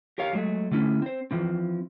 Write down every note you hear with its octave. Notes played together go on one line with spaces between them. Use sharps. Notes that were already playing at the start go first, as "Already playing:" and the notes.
G4 A#4 C#5 F5
F#3 G#3 A3
D3 A3 C#4 E4
C4 C5
E3 F3 C4